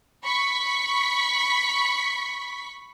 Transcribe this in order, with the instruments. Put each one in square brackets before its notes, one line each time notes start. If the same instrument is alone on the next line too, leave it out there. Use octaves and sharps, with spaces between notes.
[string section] B5 C#6 B6